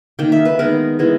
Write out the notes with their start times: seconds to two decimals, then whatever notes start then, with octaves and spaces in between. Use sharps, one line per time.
0.19 D#3 A#3 G5
0.32 E5
0.45 B4
0.59 D#3 G#3 B3 A#4
0.99 E3 G#3 B3